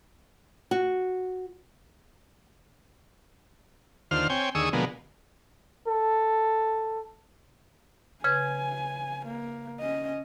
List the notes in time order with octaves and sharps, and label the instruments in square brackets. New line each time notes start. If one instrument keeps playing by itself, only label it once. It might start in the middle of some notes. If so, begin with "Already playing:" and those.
[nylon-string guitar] F#4
[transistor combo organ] D#2 D3 F4 C5 F6
C4 C#5 G5 G#5
D#2 D3 G#4 C#6 D#6 E6
B2 D3 F3 G#3 A#3 B3
[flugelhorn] A4
[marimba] C#3 B4 G#6 [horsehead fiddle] G#5
[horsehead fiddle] A#3
C#4 D#5